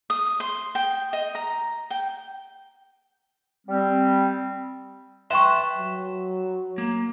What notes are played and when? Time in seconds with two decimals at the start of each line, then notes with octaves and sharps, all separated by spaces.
0.10 D#6
0.40 C6
0.75 G5
1.13 D#5
1.35 A#5
1.90 G5
3.67 G3 C4
5.31 B4 E5 G5 A5 C6 C#6
5.77 F#3
6.78 A#3